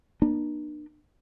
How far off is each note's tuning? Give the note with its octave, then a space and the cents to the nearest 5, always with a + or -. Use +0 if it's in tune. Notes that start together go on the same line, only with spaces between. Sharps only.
A#3 +40 D4 +40